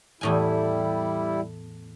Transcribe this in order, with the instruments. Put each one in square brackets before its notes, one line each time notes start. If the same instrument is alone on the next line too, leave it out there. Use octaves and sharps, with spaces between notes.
[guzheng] E2 A2 G#5 [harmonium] G3 E4